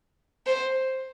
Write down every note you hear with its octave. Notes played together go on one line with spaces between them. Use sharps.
C5